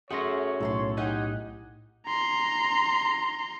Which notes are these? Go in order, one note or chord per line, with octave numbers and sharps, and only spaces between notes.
A3 C#4 F#4 G#4 C#5 C6 A#6
B1 A2 A4 A#5 C6
D#4 G4 F#5 G#5
A#5 C6